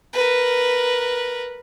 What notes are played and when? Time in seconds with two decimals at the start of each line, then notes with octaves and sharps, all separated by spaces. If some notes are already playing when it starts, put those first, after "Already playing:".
0.13 A#4 B4